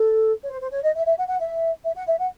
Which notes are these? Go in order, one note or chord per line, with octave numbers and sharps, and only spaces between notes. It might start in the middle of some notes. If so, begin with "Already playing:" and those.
Already playing: A4
C#5
C5
C5
C#5
D#5
E5
E5
F#5
F#5
E5
E5
F#5
E5
F#5